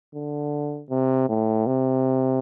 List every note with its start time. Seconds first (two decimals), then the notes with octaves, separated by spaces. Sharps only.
0.15 D3
0.90 C3
1.29 A2
1.67 C3